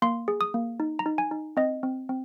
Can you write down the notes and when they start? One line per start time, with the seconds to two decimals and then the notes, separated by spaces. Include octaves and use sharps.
0.02 A#3 C6
0.28 G#4
0.41 D#6
0.54 A#3
0.80 D#4
0.99 A#5
1.06 D#4
1.18 G#5
1.31 D#4
1.57 C4 D#5
1.83 C4
2.09 C4